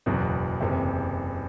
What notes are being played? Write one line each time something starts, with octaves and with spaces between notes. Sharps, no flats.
F#1 E2 B2 F#3
F#1 E2 C3